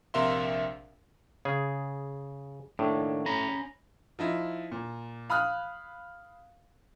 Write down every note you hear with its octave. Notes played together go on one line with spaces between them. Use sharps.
A#1 C3 A#4 E5 F5 C6
C#3 G#4
D#2 A2 D4
C#4 A#5 B5
F3 D#4 E4
A#2
F5 B5 D#6 F6 F#6